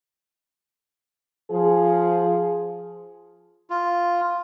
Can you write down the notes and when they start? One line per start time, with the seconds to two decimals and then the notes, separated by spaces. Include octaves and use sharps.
1.50 F3 G#4
3.70 F4